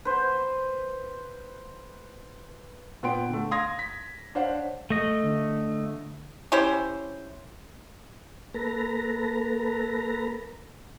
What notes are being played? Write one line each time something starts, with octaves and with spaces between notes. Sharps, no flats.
B4 C5
A#2 B3 G5 C6 D7
D3 A3
F5 C6 D#6 G#6 A#6
B6
D4 C5 C#5 F5 F#5
A3 D#5
D3
C#4 E4 G4 C5
A#3 A4 B4 A#5